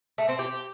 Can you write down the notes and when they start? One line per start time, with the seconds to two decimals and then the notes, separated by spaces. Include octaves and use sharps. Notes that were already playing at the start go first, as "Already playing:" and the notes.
0.18 A3
0.29 C4
0.39 G4